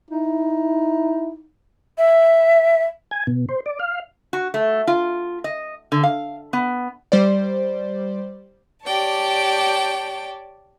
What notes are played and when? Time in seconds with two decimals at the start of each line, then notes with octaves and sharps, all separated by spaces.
0.11 D#4 E4
1.98 E5
3.11 G#5
3.27 B2
3.49 C5
3.66 D5
3.80 F5
4.33 F#4
4.54 A3
4.87 F4
5.44 D#5
5.92 D3
6.03 F5
6.53 B3
7.12 G3 C5 D5
8.84 G4 C#5 D5 G5 A5